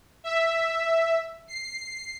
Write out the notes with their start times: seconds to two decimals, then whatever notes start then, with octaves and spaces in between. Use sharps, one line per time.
0.24 E5
1.48 C7